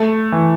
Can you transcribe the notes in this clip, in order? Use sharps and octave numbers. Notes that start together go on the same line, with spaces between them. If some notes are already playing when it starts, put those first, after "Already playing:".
Already playing: A3
E3